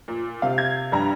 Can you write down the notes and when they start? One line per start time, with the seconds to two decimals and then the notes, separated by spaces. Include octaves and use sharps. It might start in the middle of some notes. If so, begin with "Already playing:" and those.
0.08 A#2
0.42 C3 F5
0.58 G#6
0.92 G2 G3 A#5